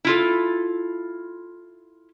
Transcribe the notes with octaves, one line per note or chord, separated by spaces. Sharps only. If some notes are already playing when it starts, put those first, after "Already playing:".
E4 F4 A4